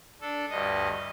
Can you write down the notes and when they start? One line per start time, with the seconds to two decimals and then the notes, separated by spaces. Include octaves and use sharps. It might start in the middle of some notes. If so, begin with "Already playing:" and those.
0.21 D4 A4
0.50 D2 G2 D#5